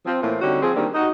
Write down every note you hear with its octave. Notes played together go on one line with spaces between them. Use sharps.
F3 C4
A2 E3 A#3 C4 F4
D3 G3 C4 C#4 D#4 F#4
F3 C4 G#4
D#3 G3 A#3 C4 D4
D#4 F#4